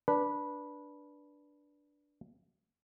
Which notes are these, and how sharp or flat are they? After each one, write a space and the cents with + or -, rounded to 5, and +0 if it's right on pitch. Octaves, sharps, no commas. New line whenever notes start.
D4 +0 B4 -15